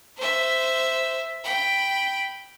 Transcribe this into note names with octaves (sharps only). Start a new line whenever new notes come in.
C5 E5
G5 B5